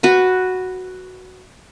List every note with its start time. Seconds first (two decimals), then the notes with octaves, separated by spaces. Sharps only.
0.03 F#4 B4 C#6